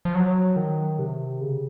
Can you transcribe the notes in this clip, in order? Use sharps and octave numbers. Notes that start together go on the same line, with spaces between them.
F3
F#3
D#3
C3
C#3